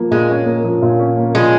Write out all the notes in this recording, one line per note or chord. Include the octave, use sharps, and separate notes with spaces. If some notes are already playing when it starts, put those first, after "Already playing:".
Already playing: F3 A#3
A#2 G#3
C#4
A#3
F3
A#2
C#4
A#3
F3 G#3